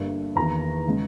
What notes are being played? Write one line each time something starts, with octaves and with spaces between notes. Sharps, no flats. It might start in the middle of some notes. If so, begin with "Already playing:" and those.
Already playing: G1 G2 G3 A#3
E2 D#3 A#3 A#5
C#3 G#3